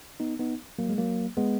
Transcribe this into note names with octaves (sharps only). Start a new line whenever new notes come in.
B3 D#4
B3 D#4
F#3 A#3
G#3
F#3 A#3
G#3 B3